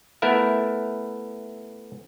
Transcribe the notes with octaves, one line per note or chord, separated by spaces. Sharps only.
A3 B3 E4 A#4 E5